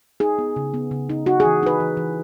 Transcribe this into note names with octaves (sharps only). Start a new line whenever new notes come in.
D#4 G#4
B3
C#3
B3
C#3
D#4
D#4 F#4
G#4
E3
D#4 B4
E3
E3